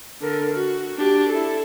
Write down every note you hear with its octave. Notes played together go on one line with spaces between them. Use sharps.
D3 A#4
F#4
D4 G4
E4 A4